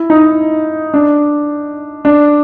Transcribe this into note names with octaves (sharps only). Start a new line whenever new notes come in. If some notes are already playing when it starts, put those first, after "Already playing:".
Already playing: E4
D#4
D4
D4